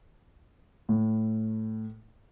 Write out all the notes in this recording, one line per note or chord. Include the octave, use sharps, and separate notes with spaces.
A2